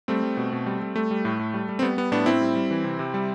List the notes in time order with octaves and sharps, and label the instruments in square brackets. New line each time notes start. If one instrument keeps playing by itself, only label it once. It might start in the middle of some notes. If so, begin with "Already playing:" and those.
[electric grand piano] G3 A3 C4
G3
B2
B2
G3
G3
G3 A3
G3
A2
A2
G3
G3
C4
G3 B3
G3 B3
A2 B3 D4
A2 C4 E4
G3
G3
E3
C3
C3
G3